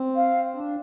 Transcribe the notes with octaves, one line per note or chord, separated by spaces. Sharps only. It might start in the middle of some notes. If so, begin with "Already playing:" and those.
Already playing: C4
F5
D4